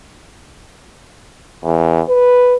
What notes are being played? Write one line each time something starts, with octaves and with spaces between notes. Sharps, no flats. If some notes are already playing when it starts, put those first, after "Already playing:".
E2
B4